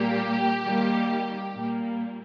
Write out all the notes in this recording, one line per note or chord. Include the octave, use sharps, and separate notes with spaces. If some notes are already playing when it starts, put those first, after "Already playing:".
Already playing: A#2 G3 A#3 G4
D#3 G3 A#3
A#2 G3 A#3